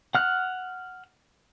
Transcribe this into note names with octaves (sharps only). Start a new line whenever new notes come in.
F#5 F6 F#6